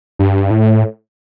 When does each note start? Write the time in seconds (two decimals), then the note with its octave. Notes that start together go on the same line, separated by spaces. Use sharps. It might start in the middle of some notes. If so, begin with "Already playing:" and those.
0.19 G2
0.51 A2